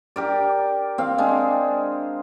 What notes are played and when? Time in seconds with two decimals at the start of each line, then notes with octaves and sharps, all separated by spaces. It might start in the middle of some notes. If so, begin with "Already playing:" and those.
0.16 G4 A#4 D5
0.98 C4 F5
1.18 G#3 D4